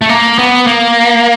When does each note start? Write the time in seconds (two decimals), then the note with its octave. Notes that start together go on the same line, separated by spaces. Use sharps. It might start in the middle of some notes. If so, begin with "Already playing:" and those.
0.01 A3
0.09 A#3
0.38 B3
0.67 A#3